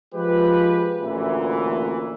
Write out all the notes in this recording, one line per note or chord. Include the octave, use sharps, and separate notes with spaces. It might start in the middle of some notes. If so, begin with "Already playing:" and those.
F3 G#3 F4 G4 B4
A1 D2 A#2 E3